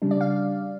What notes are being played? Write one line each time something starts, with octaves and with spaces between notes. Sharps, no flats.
C#3 G3 D4
D5
F5